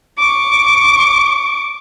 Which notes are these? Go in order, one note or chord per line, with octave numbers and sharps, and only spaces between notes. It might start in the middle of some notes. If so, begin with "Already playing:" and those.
C#6 D6